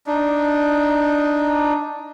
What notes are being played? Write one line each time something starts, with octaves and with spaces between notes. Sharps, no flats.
D4 D#4